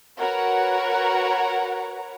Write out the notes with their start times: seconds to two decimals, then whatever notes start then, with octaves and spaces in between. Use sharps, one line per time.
0.18 F#4 A#4 B4 C#5 F#5 A#5